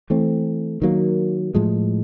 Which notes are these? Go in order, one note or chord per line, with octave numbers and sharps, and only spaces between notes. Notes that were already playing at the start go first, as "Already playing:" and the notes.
E3 A3 C4
D#3 F#3 A#3
A2 F3 G#3